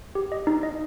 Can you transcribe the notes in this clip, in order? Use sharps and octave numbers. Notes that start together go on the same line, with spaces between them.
G4
D#5
D#4
D#5